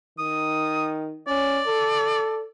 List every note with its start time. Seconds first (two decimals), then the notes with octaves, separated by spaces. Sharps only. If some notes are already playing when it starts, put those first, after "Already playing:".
0.19 D#3 D#6
1.28 C#4 D5
1.67 A4